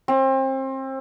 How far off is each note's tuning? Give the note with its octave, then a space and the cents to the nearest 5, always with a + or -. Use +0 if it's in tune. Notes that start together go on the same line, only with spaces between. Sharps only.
C4 +30